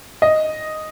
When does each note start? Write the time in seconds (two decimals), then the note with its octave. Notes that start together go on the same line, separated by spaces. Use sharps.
0.22 D#5